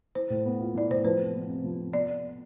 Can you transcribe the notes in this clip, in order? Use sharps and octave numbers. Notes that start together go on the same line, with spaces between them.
E3 C5
A2
B3
F4
E3 D5
A2 C5
F3 B4
C3
B3
C3
F3
C3
B3 D5